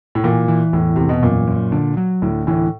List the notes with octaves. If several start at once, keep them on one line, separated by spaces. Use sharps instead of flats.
A2
A#2 E3
E3
E2 A2
E2 C3
B2
F#2 A#2
F#2
D3
F#3
D2 A2
A2 E3